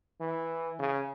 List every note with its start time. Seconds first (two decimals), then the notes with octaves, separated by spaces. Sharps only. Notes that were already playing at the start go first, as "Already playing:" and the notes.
0.20 E3
0.79 C#3